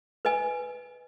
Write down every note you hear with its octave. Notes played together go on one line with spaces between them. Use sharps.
B4 D#5 G#5